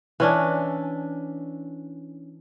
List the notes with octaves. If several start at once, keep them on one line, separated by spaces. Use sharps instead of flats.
E3 C#4 D4